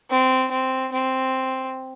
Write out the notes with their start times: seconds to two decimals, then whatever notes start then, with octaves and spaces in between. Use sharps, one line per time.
0.10 C4
0.51 C4
0.92 C4